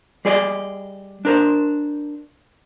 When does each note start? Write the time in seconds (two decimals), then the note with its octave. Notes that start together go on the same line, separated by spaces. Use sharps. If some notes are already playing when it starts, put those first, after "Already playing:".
0.25 G3 G#4 D5 D#5
1.25 D4 A#4 C5